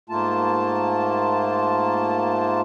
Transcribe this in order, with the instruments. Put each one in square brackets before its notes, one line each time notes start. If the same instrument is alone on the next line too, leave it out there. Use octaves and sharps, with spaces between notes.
[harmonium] G#2 A3 A#3 F4 A5